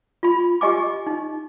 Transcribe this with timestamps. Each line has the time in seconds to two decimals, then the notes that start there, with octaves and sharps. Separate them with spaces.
0.23 F4 B5
0.61 G4 D#5 G#5 D6
1.07 D#4